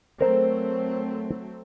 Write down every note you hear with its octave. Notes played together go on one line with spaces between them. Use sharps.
F#3 A3 C4 A#4 C5